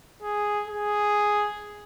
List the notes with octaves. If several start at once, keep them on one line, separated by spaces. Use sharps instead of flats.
G#4
G#4